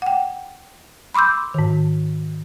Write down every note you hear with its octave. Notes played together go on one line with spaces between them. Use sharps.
F#5 G5
B5 C6 D6 E6 G6
G#2 D#3